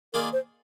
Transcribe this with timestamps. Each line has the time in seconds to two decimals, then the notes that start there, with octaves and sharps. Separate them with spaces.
0.13 D#3 A#3 F4 G#4 A#4 D5
0.33 C5